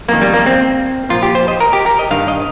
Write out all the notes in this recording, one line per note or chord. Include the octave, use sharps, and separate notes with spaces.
F2 D#3 A#3
G3
A#3
C4
A#2 F3 F4
G4
C5
D#5
A#4
G4
A#4
D#5
G2 D#3 F5
D#5